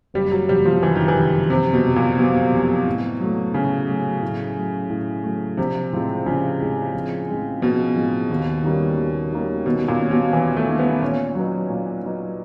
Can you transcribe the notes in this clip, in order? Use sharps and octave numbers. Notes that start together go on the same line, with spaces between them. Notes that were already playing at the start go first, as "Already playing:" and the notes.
F#1 G3
F#3
F2 C3 G3
F3
F#1 E3
D#3
E3
F2 C3
F#1 C3
B2
F2 C3
A#2
F#1 B2
F2 C3
A2
F#3 A3
A2 C#3
F#3 A3
A2
F#3 A3
A2
F#3 A3
A#1 C3
A2 F3 G#3 C4
A#1 C#3
A2 F3 G#3 C4
A#1
A2 F3 G#3 C4
A#1 B2
A2 F3 G#3 C4
D#2
D#3 G3 A#3 C#4
D#2
D#3 G3 A#3 C#4
D#2 B2
A#2
D#3 G3 A#3 C#4
B2
D#2 E3
A3
D#3 G3 A#3 C#4
B3
A#2 C#4
F#3 B3 D#4
A#2
F#3 B3 D#4